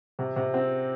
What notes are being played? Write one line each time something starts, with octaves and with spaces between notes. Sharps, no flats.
C3
C3
C4